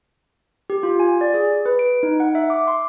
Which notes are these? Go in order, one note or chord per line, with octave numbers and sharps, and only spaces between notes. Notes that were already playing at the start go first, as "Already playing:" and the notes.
G4
F4
G#5
D5
G#4
B4
D7
D#4
F#5
E5
D6
C6